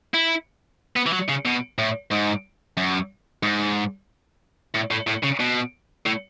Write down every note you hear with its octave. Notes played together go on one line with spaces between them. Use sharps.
E4
B3
E3
F#3
C#3
B2
A2
G#2
F#2
G#2
A2
A2
A2
C#3
B2
A2